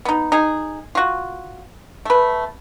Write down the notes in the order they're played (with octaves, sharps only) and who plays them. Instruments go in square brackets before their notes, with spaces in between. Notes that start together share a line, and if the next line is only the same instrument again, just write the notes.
[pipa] B3 D#4
D#4 G#4
F4 F#4
A3 B4